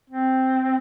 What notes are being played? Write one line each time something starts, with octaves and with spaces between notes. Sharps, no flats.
C4